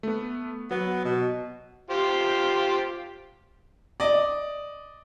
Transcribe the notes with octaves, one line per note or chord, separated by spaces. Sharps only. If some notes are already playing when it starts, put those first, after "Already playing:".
A3 B3
F#3 B3
B2
F4 G4 C5
D5 D#5